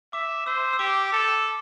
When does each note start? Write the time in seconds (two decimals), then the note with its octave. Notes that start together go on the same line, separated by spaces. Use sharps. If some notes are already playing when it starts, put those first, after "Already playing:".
0.13 E5 D6
0.46 C5 E6
0.73 E6
0.79 G4 D6
1.12 A4